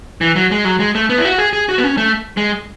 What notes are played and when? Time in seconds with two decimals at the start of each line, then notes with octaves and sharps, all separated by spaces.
0.21 E3
0.36 F#3
0.51 G#3
0.65 F#3
0.80 G#3
0.95 A3
1.10 B3
1.18 E4
1.25 F#4
1.38 G#4
1.53 G#4
1.69 F#4
1.78 B3
1.84 C#4
1.97 A3
2.37 G#3